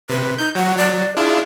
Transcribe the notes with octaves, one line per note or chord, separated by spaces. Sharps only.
C3 B4
D#4 G6
F#3 F#5
D5
D4 E4 F4 G#4